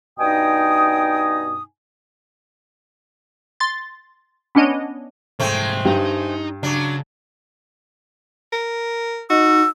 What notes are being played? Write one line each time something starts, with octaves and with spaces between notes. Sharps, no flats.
G2 B2 D#4 G5 G#5 D#6
C6 A6
B3 C#4 D4 C#5 D#5
C2 G#2 G#3 A3 C4
G2 D#4
C#2 C#3 F#3 D4
A#4
D#4 F#4 E6